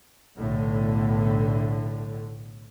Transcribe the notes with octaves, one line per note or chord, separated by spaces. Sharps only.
B1 A2 D3